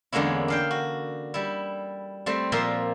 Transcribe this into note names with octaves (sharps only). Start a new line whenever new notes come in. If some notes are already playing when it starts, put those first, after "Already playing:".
E2 D3 G#3 A#3 C#4 E4
D4 F5 G5
F#4
G3 E4
G3 A3 C4
A#2 F3 A#3 E5 C6